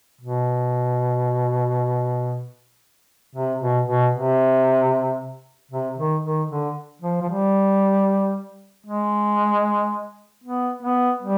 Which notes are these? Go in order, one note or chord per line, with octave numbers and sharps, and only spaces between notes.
B2
C3
B2
B2
C3
C3
D#3
D#3
D3
F3
F3
G3
G#3
B3
B3
G3